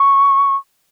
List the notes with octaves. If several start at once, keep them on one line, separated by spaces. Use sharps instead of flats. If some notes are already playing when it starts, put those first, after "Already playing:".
Already playing: C#6